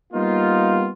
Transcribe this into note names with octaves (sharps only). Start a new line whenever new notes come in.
G3 A#3 B3 D#4 F4